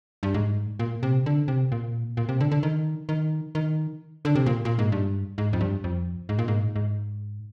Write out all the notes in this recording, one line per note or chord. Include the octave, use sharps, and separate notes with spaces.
G2
G#2
A#2
C3
D3
C3
A#2
A#2
C3
D3
D3
D#3
D#3
D#3
D3
C3
A#2
A#2
G#2
G2
G#2
F2
G2
F2
G#2
A#2
G#2
G#2